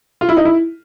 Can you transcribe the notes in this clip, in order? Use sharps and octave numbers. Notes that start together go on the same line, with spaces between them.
F4
E4
D#4
E4